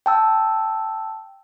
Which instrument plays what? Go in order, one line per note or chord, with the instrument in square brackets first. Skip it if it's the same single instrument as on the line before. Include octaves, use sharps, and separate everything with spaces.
[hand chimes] G5 A5 E6